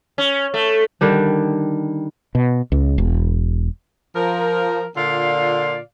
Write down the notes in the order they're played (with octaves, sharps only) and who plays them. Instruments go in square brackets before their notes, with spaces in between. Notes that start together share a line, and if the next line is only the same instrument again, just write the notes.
[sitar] C#4
A3
[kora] D3 D#3 G3 D4
[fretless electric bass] B2
C#2
E1
[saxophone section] F3 A#4
A#2 D3 F4 D5 F5